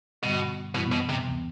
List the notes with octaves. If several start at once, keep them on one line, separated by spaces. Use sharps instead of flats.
G2 B2 D3 G3 B3
F#2 B2 E3 G3 B3 E4
B2
C3
D2 C3 E3 B3